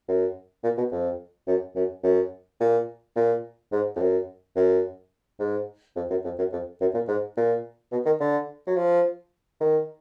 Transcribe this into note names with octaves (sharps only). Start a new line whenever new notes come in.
F#2
A#2
B2
F2
F#2
F#2
F#2
A#2
A#2
G#2
F2
F#2
F#2
G#2
F2
F#2
F2
F#2
F2
F#2
A#2
G#2
A#2
B2
D#3
D3
F#3
F3
D#3